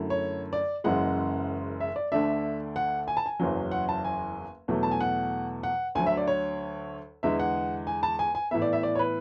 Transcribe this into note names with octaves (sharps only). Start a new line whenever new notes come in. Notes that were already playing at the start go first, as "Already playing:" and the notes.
Already playing: F#2 D3 F#3 A3 E4
C#5
D5
F#1 F#2 C#3 E3 G#3 F#5
E5
D5
D2 D3 A3 D4 E5
F#5
G#5
A5
G#5
F#1 E2 C#3 F#3
F#5
A5
G#5
E2 B2 F#3 A3
A5
G#5
F#5
F#5
D2 D3 F#3 G#5
E5
D5
C#5
E2 D3 G#3 E5
F#5
G#5
A5
G#5
G#5
A2 E3 B3 E5
D5
E5
D5
C#5
B4